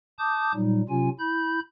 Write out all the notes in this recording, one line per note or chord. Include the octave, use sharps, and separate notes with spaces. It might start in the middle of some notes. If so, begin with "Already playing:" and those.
A5 D6 D#6 G6
A#2 F#3 G3 D#4
C3 F#3 C#4 F4 G#5
E4 B5 G6